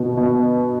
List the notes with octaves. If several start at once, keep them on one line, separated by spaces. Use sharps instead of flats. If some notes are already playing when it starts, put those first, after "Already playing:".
Already playing: B2 B3
B2